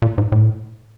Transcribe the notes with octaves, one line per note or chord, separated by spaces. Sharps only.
A#2
G#2
A2